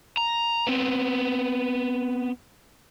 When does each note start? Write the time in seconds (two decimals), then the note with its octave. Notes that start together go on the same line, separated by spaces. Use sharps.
0.17 A#5
0.67 B3 C4